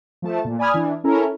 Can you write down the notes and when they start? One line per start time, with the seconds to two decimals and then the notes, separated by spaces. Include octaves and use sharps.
0.22 F3 A3 A5
0.45 A#2
0.59 D5 G#5 B5 D#6 F6 G#6
0.74 E3 D4
1.04 C#4 E4 A4 A#4